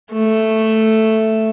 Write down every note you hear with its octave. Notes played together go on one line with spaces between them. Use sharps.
A3